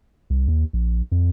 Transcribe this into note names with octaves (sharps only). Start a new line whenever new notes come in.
C2
D#2
A#1
F2